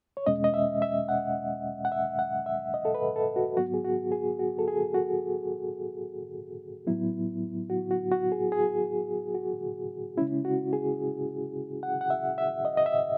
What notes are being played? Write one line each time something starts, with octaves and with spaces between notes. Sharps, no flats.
C#5
E2 B2 G#3 C#4 D#5
D#5
E5
E5
F#5
F#5
E5
F#5
E5
D#5
A4
B4
A4
F#4
G#2 F#3 B3 F#4
G#4
F#4
G#4
F#4
A4
G#4
F#4
A2 F#3 B3 E4
F#4
F#4
F#4
G#4
G#4
F#4
C#3 G#3 C#4 E4
F#4
G#4
F#5
F#5
E5
E5
D#5
D#5
E5